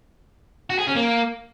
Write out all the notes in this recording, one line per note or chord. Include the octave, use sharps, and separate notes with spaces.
F#4
G#4
C#4
A#3